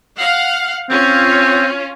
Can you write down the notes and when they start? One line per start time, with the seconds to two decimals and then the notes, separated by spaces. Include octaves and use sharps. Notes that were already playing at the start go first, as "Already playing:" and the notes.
0.17 F5 F#5
0.90 C4 C#4 F4